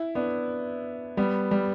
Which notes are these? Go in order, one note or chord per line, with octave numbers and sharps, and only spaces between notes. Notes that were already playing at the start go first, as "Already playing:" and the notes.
Already playing: E4
B3 D4
G3 B3
G3